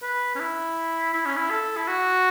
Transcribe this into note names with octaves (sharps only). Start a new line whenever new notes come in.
B4
C#4
E4
E4
C#4
E4
A4
E4
F#4